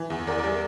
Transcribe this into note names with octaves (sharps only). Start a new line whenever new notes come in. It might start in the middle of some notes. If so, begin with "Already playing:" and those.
Already playing: E3
E2
E2 A#4 D5
A#4 D5
G3